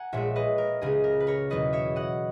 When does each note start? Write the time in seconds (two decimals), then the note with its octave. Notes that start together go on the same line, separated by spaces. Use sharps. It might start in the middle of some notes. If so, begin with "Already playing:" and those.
Already playing: F#5 G#5 A#5
0.12 A#1 A#2 G#3 C#5 E5
0.36 B4 D#5
0.58 A#4
0.81 C#2 C#3 G#3 C#4 G#4
1.04 A#4
1.20 B4
1.27 A#4 C#5
1.50 E2 B2 F#3 B3 B4 D#5
1.73 C#5 E5
1.96 D#5 F#5